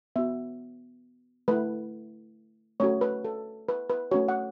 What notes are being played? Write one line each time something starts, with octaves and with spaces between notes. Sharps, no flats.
B3 F#4 E5
A3 E4 B4
A3 C#4 F#4 C#5
B4
A4
B4
B4
A3 C#4 F#4 C#5
F#5